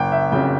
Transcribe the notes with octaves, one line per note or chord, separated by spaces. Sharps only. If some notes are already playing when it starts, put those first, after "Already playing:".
Already playing: F#1 G5
E5
F2 C#3 F#3 G5